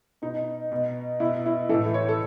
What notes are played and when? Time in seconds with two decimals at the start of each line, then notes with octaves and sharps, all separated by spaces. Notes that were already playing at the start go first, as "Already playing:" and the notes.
0.22 B2 D#4
0.72 B2
1.20 B2 E4
1.46 E4
1.69 A2 E3 A4
1.94 C#5
2.09 A4